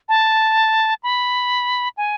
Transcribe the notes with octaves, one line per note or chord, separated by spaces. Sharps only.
A5
B5
G#5